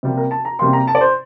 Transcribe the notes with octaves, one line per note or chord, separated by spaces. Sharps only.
C3 G3 A#3
A#4
A5
A#5
C3 G3 A#3 C6
A#5
A5
D5
C5